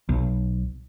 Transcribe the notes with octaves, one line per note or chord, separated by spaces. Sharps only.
B1